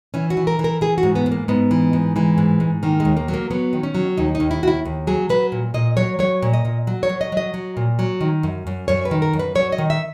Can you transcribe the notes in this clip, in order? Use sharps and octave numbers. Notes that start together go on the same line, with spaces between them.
E3 C#4
F#4
E3
A#4
E3
A#4
E3 G#4
F#4
G#2
B3
G#2
A#3
G#2 B3
E3
G#2
E3 G#3
G#2
G#2
D#3 A#3
G#3
D#2
A#3
F#3
A#3
F#3 B3
D#3
C#4
F#3
D#2 D#4
D#4
D#2
E4
D#2 E4 F#4
D#2
F#3 G#4
F#3 B4
A#2
A#2 D#5
F#3 C#5
F#3 C#5
A#2
D#5
A#2
F#3
C#5
F#3
D#5
F#3 D#5
F#3
A#2
F#3
D#3
F#2
F#2
F#2 C#5
B4
D#3
A#4
F#2
B4
F#3 C#5
D#5
D#3
E5